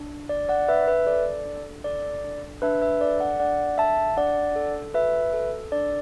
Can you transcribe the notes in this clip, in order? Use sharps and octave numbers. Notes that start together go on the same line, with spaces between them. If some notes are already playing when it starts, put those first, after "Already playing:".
Already playing: D4
D4 D5
D5 F#5
D4 B4 E5
B4 E5
A4 D5
D4
A4 D5
D4
D4 B4 E5
B4 E5
A4 D5
D5 F#5
D4 D5 F#5
A4 E5 A5
D4 D5 F#5
A4
F#4 B4 E5
A4
D4 D5